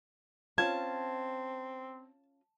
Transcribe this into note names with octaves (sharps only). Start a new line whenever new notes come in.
C4 C#4 F4 A5 G#6